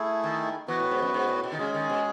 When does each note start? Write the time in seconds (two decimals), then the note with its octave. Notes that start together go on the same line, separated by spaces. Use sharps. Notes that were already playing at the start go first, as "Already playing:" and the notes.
Already playing: A3 E4 G#4
0.24 D#3
0.68 E3 B3 F#4 B4
0.80 A2
0.91 G#2
1.02 F#2
1.14 G#2
1.29 A2
1.44 B2
1.52 D#3
1.58 C#3 G#3 C#4 G#4
1.74 D#3
1.90 B2